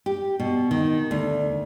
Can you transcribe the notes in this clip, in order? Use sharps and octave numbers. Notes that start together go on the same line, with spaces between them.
G4
B2
D#3
D2